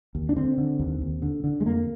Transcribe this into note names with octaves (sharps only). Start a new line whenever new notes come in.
D#2
D4
D3 C4
D3
D#2
D#2
D3
D3
G#3
F2 A#3